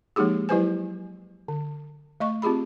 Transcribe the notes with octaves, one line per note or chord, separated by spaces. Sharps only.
F3 G#3 A#3 D#4 G4 G#4
F#3 E4 G4 B4 C5 G#5
D3
A3 D#5 C#6
C4 F4 G4 G#4 B5